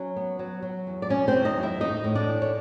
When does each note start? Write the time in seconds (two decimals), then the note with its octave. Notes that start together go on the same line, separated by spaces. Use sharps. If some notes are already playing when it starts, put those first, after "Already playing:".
Already playing: F#3 C#4 C#5
0.17 B3
0.39 F#3
0.63 F#3
0.87 E2
1.02 D5
1.09 B2 C#4 C#5
1.28 C4 C5
1.33 E2
1.45 D#4 D#5
1.57 F#3
1.63 E4 E5
1.80 A2 D#4 D#5
2.04 A2
2.15 D4 D5
2.28 E3
2.42 C#5